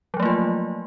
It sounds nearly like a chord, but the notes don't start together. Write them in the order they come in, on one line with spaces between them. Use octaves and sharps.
F#3 F3 A3 A#3 F4